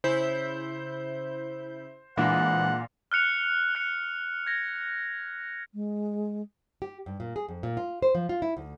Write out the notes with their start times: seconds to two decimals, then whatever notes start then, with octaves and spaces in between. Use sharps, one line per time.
0.04 C#3 E4 C5 G6
2.17 A#2 E3 G#3 D4 F#5
3.12 F6 F#6 C#7 F7
3.75 F#6 C#7
4.46 G#6 A#6
5.73 G#3
6.82 G4
7.06 G2
7.20 A#2
7.36 G#4
7.48 F2
7.63 A#2
7.77 F4
8.02 C5
8.15 F3
8.29 F4
8.42 E4
8.57 D2